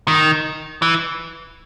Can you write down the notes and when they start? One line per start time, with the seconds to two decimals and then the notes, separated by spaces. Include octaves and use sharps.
0.08 D#3
0.82 E3